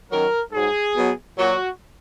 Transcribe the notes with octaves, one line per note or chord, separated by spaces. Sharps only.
F#2 D#3 F#3 A#4
G#2 F#3 G#4
B2 F#3
A#2 F#3 F#4